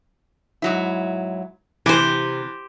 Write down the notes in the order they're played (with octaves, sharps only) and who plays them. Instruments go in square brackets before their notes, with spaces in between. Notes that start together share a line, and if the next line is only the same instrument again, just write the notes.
[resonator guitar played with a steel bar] G#2 F#3 E4
[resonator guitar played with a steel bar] C3 [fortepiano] E3 [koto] G4 C5